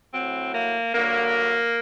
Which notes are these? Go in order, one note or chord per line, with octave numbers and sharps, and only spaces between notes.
A2 F#3 C4
A#3
G2 D3 F#3 A#3